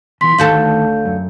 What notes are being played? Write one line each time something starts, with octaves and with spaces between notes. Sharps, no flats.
E2 E3 C6 B6
D2 D#3 F#4 A4 F5 G6
F#2 A3